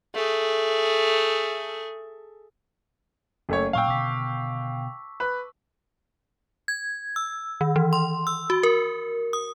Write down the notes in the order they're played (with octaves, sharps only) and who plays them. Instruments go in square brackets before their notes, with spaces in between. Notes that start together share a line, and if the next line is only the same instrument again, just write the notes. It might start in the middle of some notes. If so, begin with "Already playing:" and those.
[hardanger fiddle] A3 G#4
[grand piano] F#1 A3 C#5
[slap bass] A#2 F#3 [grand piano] F5 G5 [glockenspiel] A5 C#6 E6
[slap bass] B2 D3 D#3 [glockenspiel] D6 B6
[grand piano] B4
[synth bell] G#6
E6
D#3
E3
C6
E6
F#4
A#4
D#6